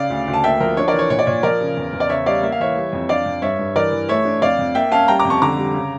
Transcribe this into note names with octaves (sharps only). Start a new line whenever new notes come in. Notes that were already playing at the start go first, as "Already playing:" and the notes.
Already playing: C#3 D5 F5
D2
D2
A5
A#3 E5 G5
F3 A#4
D4 C#5
A#4 D5
E3
C#5
A#2 C#5
D5
A#2 C#5
F3 A#4 D5
C#3
E2
E2
D5
C#3 C#5 E5
G3 D5 F5
A#3 E5
F5
E3 C#5 E5
G3
F2
D4 D5 F5
F2
G2 C#5 E5
G2
E3 A#4 D5
E3
A3 C#5 E5
D4
F2 D5 F5
F2
A#3 E5 G5
C#4 F5 A5
G3 G5 A#5
A#5 D6
F2
A5 C#6
D3 A#5 D6
G3
C#3